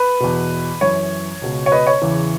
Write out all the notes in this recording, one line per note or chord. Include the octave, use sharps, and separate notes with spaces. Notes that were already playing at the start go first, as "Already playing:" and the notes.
Already playing: B4
E2 B2
F#2 E3 C#5
C#2 B2
C#5
B4 D#5
C#5
E2 C#3 E3